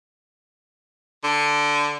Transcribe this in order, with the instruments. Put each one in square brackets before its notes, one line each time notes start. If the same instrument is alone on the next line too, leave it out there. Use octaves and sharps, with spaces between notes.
[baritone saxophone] D3